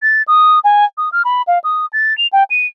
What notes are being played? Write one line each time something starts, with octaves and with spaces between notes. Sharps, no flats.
A6
D#6
G#5
D#6
F6
B5
F5
D#6
A6
F7
G5
D#7